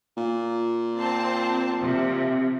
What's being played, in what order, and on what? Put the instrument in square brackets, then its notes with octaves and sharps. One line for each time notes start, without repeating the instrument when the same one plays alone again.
[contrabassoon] A#2
[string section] C4 C5 A5
C3 F3